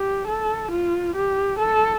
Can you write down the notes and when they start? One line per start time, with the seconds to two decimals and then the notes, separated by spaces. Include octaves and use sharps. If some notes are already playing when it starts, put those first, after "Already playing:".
Already playing: G4
0.28 A4
0.71 F4
1.15 G4
1.59 A4